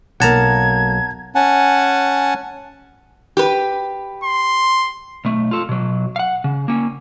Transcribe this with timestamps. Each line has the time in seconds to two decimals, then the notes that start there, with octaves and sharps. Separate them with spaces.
0.20 B1 A#3 F#5 A5 A#5 G#6
1.35 C#4 F#5 G#5 A5
3.37 G4 B4
4.24 C6
5.25 B1 A3
5.51 F4 A4
5.69 B2 F#3
6.16 F5 F#5
6.44 C#3
6.68 A#3 C#4